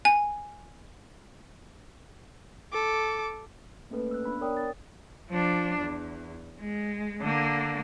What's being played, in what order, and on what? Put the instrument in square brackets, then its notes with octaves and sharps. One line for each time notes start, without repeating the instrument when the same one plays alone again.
[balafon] G#5
[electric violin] A4 D6
[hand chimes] A3 A#3 C#4 A4 B4
E6 F#6
B3 D4 B5 F#6
A#4 C#5 D5 G5 D#6
A6
[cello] F3 D4
E2
G#3
D3 A#3